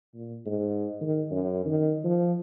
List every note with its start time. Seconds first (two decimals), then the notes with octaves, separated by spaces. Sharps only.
0.14 A#2
0.46 G#2
1.01 D#3
1.31 F#2
1.66 D#3
2.04 F3